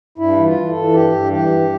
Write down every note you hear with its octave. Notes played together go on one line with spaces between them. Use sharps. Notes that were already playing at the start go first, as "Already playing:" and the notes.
G2 E4
E3
F4
E3
A4
E3
G2 G4
G2
E3 G4
G2